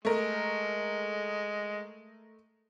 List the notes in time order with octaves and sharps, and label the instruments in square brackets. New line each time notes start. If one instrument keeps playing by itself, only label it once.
[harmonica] G#3 [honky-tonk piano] A3 A#4